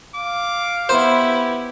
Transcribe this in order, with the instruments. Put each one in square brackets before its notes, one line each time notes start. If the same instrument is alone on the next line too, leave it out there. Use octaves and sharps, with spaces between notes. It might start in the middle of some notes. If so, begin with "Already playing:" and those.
[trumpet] F5 [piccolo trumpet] D6
[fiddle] B3 E4 [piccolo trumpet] G4 [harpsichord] C5